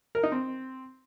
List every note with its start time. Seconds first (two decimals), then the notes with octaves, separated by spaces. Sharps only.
0.15 A#4
0.23 D#4
0.32 C4